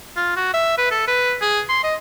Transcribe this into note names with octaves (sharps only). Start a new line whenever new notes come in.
F4
F#4
E5
B4
A4
B4
G#4
C6
D#5